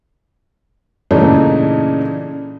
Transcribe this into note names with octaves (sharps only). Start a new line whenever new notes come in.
A#2 C#3 E3 A3 D4 D#4